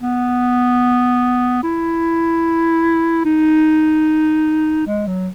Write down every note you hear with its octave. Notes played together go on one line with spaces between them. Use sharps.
B3
E4
D#4
G#3
F#3